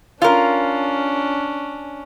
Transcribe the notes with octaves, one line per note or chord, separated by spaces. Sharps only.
C#4 D4 F4 A#4